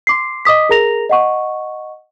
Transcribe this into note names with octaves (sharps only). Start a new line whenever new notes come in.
C6 D6 C7
D#5 D6 D#6 B6
G#4 A#4 A#5 A#6 F7
D#5 F#5 C#6